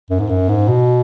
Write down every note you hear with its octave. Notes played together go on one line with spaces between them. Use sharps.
F#2
G#2
F#2
G#2
B2